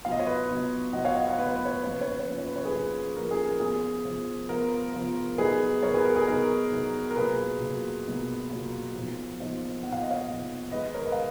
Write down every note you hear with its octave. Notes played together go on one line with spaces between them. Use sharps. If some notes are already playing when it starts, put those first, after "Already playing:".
F#3 B3 F4 F5
D#5
C#5
B4 D#5
F#3 B3 F4
F#3 B3 F4 D#5 F#5
C#5 F5
D#5 F#5
C#5 F5
F#3 B3 F4 B4
C#5
B4
C#5
B4
F3 A#3 C#4 F4 C#5
B4
C#5
B4
C#5
F3 A#3 C#4 F4 B4
C#5
B4
C#5
G#4 B4
F3 A#3 C#4 F4
F3 A#3 C#4 F4 A#4
G#4
A#4
F3 B3 F4 G#4
F3 B3 F4
F3 B3 F4 A#4
F3 B3 F4
F#3 B3 D#4 G#4 B4
F#3 B3 D#4 A#4 C#5
G#4 B4
A#4
G#4
F#3 B3 D#4 A#4
F#3 B3 D#4
A#4
B2 F#3 A#3 F4 G#4 B4
B2 F#3 A#3 F4
B2 F#3 A#3 F4
B2 F#3 A#3 F4
A#2 F3 B3 D#4
A#2 F3 B3 D#4
A#2 F3 B3 D#4 F#5
F5
D#5
C#5 F5
A#2 F3 B3 D#4
D#3 G#3 D#4 B4 D#5
A#4 C#5
B4 D#5
F5